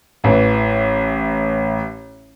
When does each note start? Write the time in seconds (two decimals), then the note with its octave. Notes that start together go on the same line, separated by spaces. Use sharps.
0.24 A1 E3